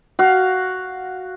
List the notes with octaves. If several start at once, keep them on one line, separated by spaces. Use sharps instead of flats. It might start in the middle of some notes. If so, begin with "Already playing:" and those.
F#4 F5